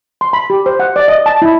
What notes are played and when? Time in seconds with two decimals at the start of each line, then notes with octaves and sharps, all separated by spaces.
0.21 C6
0.33 B5
0.50 G4
0.66 C5
0.80 F#5
0.96 D5
1.08 D#5
1.26 A5
1.42 E4